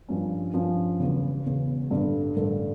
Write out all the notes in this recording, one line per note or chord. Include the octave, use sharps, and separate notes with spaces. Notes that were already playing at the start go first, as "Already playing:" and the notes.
G2 F3 C#4
G2 F3 C#4
E1 E2 C#3
E1 E2 C#3
A1 G2 D3 A3 D4
A1 G2 D3 A3 D4